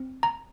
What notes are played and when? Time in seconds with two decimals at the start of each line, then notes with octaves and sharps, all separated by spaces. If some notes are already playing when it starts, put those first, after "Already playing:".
Already playing: C4
0.23 A#5